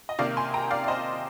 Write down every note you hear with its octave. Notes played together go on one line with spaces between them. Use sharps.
D#5
C3 D#3 A#3 D5 F5
G#5 C6
G5 A#5
D5 F5
D5
C5 D#5